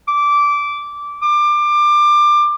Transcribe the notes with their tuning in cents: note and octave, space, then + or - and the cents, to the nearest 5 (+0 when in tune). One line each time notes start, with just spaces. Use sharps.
D6 -15
D6 +20